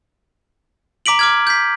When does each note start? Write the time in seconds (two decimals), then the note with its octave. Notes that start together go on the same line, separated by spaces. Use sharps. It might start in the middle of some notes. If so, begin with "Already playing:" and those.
1.06 A#5 D6 B6 D7 F#7
1.19 D6 F6 G#6
1.47 G6 B6